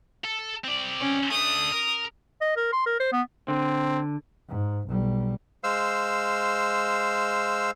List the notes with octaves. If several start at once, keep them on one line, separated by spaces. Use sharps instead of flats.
A4
C4 D5
C#4
A3 D4 D#6
A#4
D#5
A#4
C6
A#4
C5
B3
D3 C4
G#2
B1 G3
G#3 C5 F5 E6